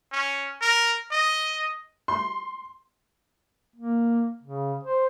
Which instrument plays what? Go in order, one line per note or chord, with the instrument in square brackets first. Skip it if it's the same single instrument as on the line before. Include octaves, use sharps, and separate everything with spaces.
[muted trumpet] C#4
A#4
D#5
[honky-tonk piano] C6
[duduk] A#3
C#3
C5